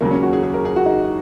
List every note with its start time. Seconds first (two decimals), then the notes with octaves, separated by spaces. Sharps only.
0.01 D#2 C#3 F#3 A#3
0.11 C#4
0.23 F#4
0.33 G#4
0.43 G#4
0.54 A#4
0.65 G#4
0.76 F#4
0.86 D#4